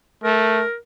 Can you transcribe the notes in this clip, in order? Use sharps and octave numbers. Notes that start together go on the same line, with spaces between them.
A3 A#4